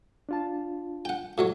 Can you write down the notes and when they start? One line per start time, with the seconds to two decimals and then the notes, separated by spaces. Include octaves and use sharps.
0.29 D4 F4 A5
1.05 F#5 G5
1.38 A2 F#3 C#5